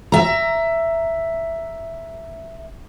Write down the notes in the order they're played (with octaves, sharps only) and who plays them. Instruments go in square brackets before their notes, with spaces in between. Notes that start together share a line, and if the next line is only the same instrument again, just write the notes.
[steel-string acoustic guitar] E5 A#5